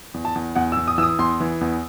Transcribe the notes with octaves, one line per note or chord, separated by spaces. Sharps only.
E2
A5
E2
E2 F#5
E6
E2
D#6
E3 D#6 E6
E2 C6
E3
E2